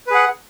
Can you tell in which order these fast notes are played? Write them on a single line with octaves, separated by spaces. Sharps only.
B4 G#4 F#5